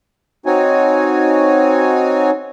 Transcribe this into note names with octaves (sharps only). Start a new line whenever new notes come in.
C4 D#4 F#4 C#5 G#5